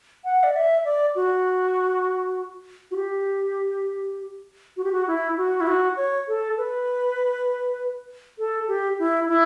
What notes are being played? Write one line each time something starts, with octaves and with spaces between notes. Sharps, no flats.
F#5
D5
E5
D5
F#4
F#4
G4
F#4
G4
F#4
E4
F#4
E4
F#4
C#5
A4
B4
A4
G4
E4
E4